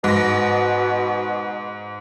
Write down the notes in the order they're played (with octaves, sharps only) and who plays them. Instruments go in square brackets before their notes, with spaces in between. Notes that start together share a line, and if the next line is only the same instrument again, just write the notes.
[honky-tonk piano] G#2 A#6 [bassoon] B2